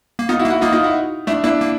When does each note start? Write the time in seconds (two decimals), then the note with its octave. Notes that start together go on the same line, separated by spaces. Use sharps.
0.19 A#3
0.29 B3 D#4 F4
0.39 E4 F#4
0.45 A#3
0.50 E4 F#4
0.61 A#3 D#4 F4
0.72 D#4 F4
0.83 E4 F#4
1.27 A3 D4 E4
1.44 A#3 D4 E4
1.61 A#3